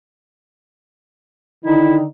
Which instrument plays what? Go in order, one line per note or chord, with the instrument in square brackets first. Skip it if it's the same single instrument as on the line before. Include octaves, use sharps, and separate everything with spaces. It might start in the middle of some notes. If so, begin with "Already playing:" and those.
[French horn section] D3 D#3 D#4 [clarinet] E4